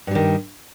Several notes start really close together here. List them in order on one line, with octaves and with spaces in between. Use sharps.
G2 G3 D#3